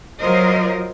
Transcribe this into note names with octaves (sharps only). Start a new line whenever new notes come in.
F#3 F4 A#4 C5 D#5